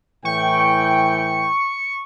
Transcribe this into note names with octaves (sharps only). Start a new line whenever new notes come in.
A2 E3 G5 C#6